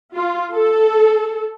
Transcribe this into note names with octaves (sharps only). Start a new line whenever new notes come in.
F4
A4